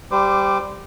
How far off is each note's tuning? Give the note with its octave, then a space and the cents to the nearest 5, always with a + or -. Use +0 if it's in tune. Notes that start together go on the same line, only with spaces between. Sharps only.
G3 +0 C5 -25 D6 +10